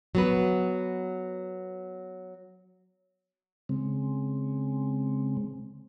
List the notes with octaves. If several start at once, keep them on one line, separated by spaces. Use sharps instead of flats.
F#3 B3 B4
C#3 G#3 C4